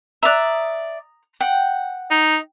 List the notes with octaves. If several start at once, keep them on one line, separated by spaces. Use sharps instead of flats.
D5 E5 A#5 D#6 F#6
F#5 G5
D#4